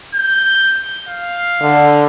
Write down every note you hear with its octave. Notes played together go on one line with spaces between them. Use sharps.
G6
F5
D3